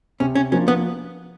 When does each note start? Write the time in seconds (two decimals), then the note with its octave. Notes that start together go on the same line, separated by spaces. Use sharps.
0.20 C3 C#4
0.35 C#4
0.52 F3 A#3 C#4 D4
0.68 B3